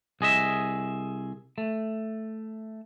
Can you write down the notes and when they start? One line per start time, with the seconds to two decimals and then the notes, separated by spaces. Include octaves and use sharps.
0.21 C2 G#4 D#5 E5
1.58 A3